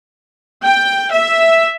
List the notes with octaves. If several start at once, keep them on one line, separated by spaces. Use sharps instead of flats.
G5
E5